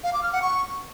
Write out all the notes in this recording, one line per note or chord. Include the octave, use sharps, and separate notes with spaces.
F5
D6
F6
F#5
C#6